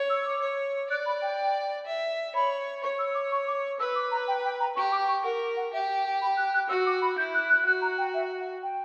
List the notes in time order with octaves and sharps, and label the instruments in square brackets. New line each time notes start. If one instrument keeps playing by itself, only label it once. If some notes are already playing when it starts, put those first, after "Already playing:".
Already playing: [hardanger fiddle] C#5
[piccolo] E6
D6
[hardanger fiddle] C#5
[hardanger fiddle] D5 [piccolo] F#6
[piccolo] B5
G5
[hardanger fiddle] E5
[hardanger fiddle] C#5 [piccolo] B5
[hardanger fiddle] C#5 [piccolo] C#6
[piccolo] E6
D6
C#6
D6
[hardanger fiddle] B4 [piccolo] E6
[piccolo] D6
A#5
G5
G5
A#5
[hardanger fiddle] G4 [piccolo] C#6
[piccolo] D6
C#6
[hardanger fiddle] A#4 [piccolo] F#5
[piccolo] F#5
[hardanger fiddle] G4 [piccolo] E5
[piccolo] G5
B5
F#6
F#6
[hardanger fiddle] F#4 [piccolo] E6
[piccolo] D6
B5
[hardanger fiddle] E4 [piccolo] G6
[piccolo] F#6
F#6
[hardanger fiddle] F#4 [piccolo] F#6
[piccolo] A#5
G5
E5
F#5
G5